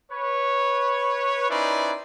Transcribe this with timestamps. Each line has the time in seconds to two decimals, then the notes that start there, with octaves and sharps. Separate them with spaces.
0.12 B4 C#5
1.50 C#4 D#4 E4 B4 C5 D5